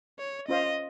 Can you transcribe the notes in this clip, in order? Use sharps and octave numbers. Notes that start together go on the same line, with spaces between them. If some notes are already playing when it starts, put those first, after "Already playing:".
C#5
C#4 F4 C5 D#5 F5